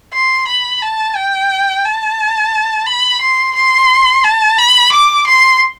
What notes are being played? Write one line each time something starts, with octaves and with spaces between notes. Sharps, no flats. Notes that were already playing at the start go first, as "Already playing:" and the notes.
C6
B5
A5
G5
A5
B5
C6
C6
A5
B5
D6
C6